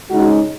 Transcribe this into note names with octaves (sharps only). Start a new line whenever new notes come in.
C#3 G#3 D#4 F#4